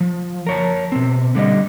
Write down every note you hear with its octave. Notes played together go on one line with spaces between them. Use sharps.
F3
A#4 C#5 A5
B2 C4
D3 G3 D5 D#5